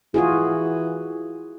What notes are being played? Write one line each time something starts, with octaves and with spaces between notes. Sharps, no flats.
E3 F4 F#4 G#4